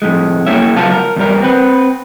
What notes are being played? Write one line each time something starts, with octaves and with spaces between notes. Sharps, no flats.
F2 A2 G#3
A#3 C#4 E4 C#5 E5
C#2 F#3 B3 F4 F5 A5
A#4
E2 G2 G3 A#4
C4 B4